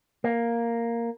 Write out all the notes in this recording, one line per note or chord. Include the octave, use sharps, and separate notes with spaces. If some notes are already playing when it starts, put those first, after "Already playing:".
A#3